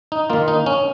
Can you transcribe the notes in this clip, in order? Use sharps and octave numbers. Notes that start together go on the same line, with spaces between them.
D#4
D#3 A#3 F4
D#4
C#4